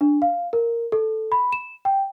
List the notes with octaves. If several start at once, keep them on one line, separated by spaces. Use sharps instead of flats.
D4
F5
A#4
A4
B5
E7
G5